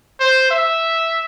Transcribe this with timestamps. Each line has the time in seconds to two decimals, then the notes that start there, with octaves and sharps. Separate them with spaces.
0.20 C5
0.51 E5